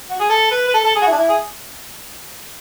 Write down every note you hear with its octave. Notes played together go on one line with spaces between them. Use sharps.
F#4
G#4
A4
B4
B4
A4
A4
G#4
F#4
E4
D4
E4
G#4